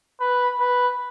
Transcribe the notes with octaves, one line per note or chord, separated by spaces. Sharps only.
B4
B4